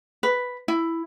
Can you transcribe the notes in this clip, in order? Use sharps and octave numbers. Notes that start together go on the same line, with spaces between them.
B4
E4